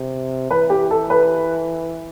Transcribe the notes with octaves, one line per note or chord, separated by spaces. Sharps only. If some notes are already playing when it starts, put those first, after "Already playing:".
Already playing: C3
E3 B4
G4
A4
B4